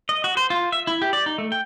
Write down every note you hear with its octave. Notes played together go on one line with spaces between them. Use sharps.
D#5
F#4
C5
F4
E5
E4
G4
D5
D#4
A3
G5